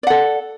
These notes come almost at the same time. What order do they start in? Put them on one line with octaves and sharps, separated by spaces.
D5 F#5 A4